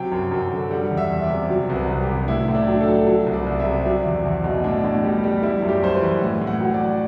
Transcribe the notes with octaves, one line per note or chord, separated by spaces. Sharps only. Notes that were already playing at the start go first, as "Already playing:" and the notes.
Already playing: C3 F#3 G5
F#2
F#2
D3
G3 F#5
E2
E5
E2
D5
C3
F#3
C2
B4
C2
G4
C3
D4
A2 E4
A2
D4
F#3
A4
F#3
F#3
C2
D5
C2
E5
C3
F#3 D5
E2
E2 E4
B2
A2 D4
A2
G3
G3
G3 E4
F#2
G4
F#2 C5
B4
E3
A2
A2
F#5
F#3
D5
F#3